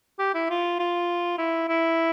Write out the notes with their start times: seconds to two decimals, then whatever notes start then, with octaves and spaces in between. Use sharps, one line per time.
0.19 G4
0.34 E4
0.50 F4
0.79 F4
1.38 E4
1.69 E4